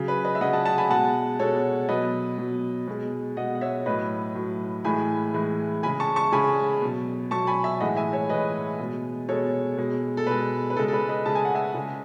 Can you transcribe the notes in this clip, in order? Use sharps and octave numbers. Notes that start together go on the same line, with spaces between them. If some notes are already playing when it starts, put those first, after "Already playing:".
Already playing: C#3 F#3
B4
B4 D#5
E5
C#3 F#3 D#5 F#5
F#5 A5
F#5 A5
G#5 B5
B2 G#3 F#5 A5
B2 G#3 A4 C#5
B2 F#3 B4 D#5
B2 F#3
B2 G#3
B2 G#3 D#5 F#5
F#5
C#5 E5
A2 F#3 B4 D#5
A2 F#3
A2 E3 G#3 G#5 B5
A2 E3 G#3
C#3 G#3 G#5 B5
A5 C#6
A5 C#6
C#3 G#3 G#5 B5
B2 F#3
B2 F#3 A5 C#6
G#5 B5
E5 G#5
A2 E3 G#3 D#5 F#5
E5 G#5
C#5 E5
A2 E3 G#3 B4 D#5
B2 G#3
B2 G#3 A4 C#5
B2 G#3
A4
B2 G#3 B4
B4
C#3 G#3 A4
A4
B4
B4 D#5
C#3 G#3 A5
G#5
F#5
E5 G#5
C#3 G#3